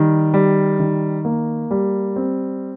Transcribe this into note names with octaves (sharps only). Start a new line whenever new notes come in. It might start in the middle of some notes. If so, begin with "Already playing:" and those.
Already playing: D#3 G3
G3
D#3
A#3
G3
C4